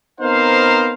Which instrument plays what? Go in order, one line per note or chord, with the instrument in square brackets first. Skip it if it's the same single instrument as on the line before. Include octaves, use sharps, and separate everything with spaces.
[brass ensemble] B3 C4 D#4 A#4 C5 F5